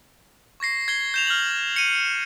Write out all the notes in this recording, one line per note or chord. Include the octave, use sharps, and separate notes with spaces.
C#6 G#6 A#6 C7
G#6 C7 G7
G6 E7 F7
F6 G6 F#7
C#7 D#7